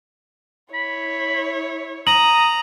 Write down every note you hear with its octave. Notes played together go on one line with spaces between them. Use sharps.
E4 C#5 B5
A#5 D#6 F#7